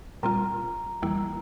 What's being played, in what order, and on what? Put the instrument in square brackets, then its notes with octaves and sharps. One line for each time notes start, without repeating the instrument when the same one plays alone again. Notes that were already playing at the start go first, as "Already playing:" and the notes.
[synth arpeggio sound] A#2 G3 C4 F4 [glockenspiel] A#5
[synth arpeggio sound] E2 E3 G3 A#3 E4